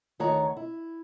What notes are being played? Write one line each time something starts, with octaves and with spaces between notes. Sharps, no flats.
D2 D#3 C#5 F#5 A#5
E4